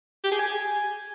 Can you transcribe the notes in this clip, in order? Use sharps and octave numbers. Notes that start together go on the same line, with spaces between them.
G4
G#4
G#5